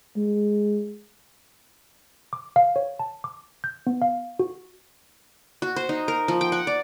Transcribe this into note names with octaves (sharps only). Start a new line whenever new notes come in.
G#3
D6
F5
C#5
A5
D6
G6
B3
F5
F#4
F#4
C5
D#4
A#4
F3
G5
F#5
D5